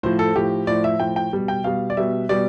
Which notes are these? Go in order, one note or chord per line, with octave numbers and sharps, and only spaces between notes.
A2 F3 C5
A4
A2 F3 G4
A2 F3 D5
E5
A2 F3 G5
G5
B2 G3
G5
B2 G3 F5
D5
B2 G3 E5
B2 G3 D5